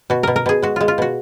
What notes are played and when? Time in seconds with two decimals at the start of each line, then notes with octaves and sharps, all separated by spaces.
0.10 B2 F#4
0.23 B2 A#4
0.36 A#4
0.46 B2 G#4
0.62 G#3 F#4
0.76 G#3 F4
0.88 F4
0.98 B2 F#4